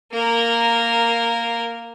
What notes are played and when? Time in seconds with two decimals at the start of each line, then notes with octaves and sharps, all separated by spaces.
0.13 A#3 A#4